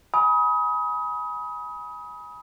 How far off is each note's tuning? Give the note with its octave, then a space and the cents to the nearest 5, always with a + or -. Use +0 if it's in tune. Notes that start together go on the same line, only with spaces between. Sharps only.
G#5 +0 B5 -25 D#6 +25